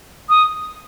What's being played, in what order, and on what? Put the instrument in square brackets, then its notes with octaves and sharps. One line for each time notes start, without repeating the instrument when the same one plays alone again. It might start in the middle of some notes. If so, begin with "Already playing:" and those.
[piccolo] D#6